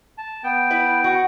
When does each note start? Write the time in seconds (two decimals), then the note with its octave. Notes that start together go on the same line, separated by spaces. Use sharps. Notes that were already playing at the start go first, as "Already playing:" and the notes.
0.18 A5
0.44 B3 G5
0.70 E4 B4
1.04 F#4